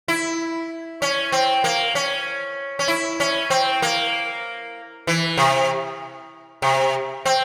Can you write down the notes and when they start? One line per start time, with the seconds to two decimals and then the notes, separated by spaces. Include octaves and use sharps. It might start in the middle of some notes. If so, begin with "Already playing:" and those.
0.08 E4
1.02 C#4
1.32 C4
1.64 A#3
1.95 C#4
2.79 C#4
2.88 E4
3.20 C#4
3.50 C4
3.82 A#3
5.07 E3
5.37 C3
6.62 C3
7.25 C4